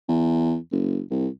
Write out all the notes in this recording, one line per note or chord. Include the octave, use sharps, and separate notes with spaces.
E2
F#1
C2